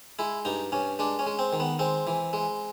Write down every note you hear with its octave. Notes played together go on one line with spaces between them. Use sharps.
G#3 E4
G2 D#4
G2 C#4
G#3 D4
C#4
G#3
C4
D#3
B3
G#3 C4
E3
G#3